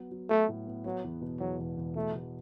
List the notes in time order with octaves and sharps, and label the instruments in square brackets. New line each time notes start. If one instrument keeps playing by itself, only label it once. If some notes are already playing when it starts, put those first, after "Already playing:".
Already playing: [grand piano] F#3 B3
F#3
[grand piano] F#3 [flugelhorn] A3
[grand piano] A2
B3
[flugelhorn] F#3 [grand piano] B3
[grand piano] E2
B2
[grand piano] E2 [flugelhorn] F#3
[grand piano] E1
E2
[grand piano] B2 [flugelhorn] A3
[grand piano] E2